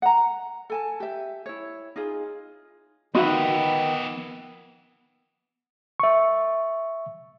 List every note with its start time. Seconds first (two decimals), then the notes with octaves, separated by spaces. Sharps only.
0.02 F#5 A#5
0.70 A4 G#5 A5
1.00 G4 E5
1.46 E4 C#5
1.96 D#4 F4 G#4
3.15 D#3 F3 B3 D#4 F#4 B4 E5 F#5
6.00 E5 C#6